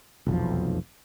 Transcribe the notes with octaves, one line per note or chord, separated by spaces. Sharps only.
F1 B1 E2 F3